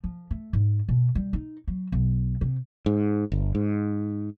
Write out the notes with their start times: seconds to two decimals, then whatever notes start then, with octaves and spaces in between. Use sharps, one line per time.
0.04 F3
0.31 A3
0.53 G#2
0.89 B2
1.15 G3
1.33 D#4
1.68 F#3
1.92 B1
2.41 C3
2.86 G#2
3.32 G1
3.55 G#2